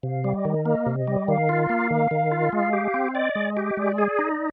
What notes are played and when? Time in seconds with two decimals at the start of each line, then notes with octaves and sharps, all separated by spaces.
0.03 C3 F5
0.24 G3
0.35 D#5
0.45 D#3
0.65 A#3 D#5
0.86 C3
0.96 D#5
1.07 G3
1.28 D#3 F5
1.49 F4
1.69 A#3
1.90 D#3
2.11 D#3
2.32 F4
2.53 G#3 F5
2.73 G4
2.94 C4
3.15 D5 D#5
3.35 G#3
3.57 G4
3.77 G#3 D5
3.98 G#4
4.19 D#4